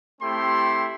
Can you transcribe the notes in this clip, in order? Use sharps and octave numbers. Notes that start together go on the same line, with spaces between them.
A3 C4 E4 G4 C6